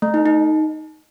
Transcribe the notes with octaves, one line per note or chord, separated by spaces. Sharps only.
A3
D#4
D#4